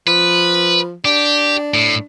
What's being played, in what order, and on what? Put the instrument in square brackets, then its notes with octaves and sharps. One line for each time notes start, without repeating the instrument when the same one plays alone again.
[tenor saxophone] F3 [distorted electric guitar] B4
[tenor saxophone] D4 [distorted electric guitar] G4
[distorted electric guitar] A2